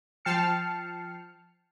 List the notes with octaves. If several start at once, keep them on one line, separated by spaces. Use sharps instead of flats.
F3 G5 A5 F6 C7 C#7